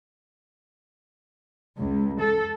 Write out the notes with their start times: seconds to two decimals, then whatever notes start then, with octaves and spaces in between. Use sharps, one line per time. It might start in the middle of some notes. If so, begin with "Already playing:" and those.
1.77 C#2
2.19 A4